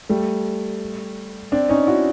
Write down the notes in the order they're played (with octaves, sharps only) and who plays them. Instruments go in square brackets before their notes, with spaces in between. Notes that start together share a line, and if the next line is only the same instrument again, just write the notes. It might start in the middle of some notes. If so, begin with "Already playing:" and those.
[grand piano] G3 A3
C4 D4
C#4 D#4
E4 F#4